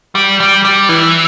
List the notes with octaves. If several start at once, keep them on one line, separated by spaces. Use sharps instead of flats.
G3
G3
G3
E3